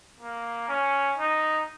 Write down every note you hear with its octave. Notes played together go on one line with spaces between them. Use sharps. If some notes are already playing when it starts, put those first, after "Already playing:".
A#3
C#4
D#4